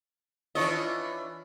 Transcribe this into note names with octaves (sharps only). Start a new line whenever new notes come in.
E3 D4 F4 C#5 D#5